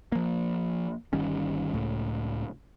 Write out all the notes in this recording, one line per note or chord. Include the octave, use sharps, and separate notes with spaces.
F3 A#3
G1 D#3 G3 C#4
C#2 A2